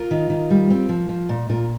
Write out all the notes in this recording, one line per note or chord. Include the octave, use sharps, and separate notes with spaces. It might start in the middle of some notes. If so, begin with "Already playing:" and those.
Already playing: F4 A#4
D#3
D#3
G3
C4
F3
F3
A#2
A#2 F4 A#4